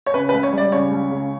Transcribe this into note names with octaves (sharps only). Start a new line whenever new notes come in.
C#5
C#3 B4
B4
C#2
C#5
G3
D5
C#3 C#5
C#2
C#3